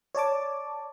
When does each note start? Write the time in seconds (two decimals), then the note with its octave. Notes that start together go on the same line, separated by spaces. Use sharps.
0.15 C#5 D5 A5 D6